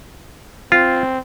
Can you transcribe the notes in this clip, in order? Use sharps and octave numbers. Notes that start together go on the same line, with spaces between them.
C4 F4